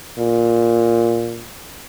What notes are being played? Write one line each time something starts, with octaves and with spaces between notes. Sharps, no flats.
A#2